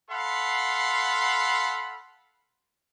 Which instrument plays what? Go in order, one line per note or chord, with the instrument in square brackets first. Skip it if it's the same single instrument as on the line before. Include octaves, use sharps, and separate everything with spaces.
[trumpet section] A4 F5 F#5 B5 C6